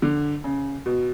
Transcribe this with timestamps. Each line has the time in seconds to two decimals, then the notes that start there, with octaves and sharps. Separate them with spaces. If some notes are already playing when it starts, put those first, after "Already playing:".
0.02 D3
0.44 C#3
0.86 B2